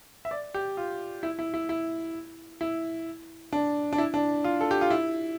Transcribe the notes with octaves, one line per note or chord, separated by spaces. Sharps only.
E5
D5
G4
F4
E4
E4
E4
E4
E4
D4
D4
E4
D4
F4
A4
G4
F4
E4